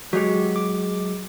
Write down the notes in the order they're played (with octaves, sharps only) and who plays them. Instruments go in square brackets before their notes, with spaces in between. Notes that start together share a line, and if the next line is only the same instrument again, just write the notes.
[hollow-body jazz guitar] F#3 G#3 [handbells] F#4 G4
[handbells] D6